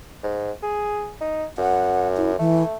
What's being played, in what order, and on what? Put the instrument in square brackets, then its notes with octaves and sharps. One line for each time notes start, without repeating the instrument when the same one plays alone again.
[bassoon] G#2
G#4
D#4
[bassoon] F#2 [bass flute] F#5
[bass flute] E4
[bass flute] E3 [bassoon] A3